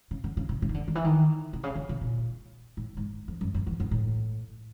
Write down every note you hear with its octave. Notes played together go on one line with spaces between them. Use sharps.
C#3
D3
C#3
C3
C#3
D#3
D3
D#3
E3
D#3
C3
C#3
D3
C3
A#2
A2
G#2
F2
F#2
F#2
E2
F#2
A2